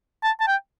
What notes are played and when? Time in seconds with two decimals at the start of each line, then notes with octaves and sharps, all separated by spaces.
0.24 A5
0.41 A5
0.48 G5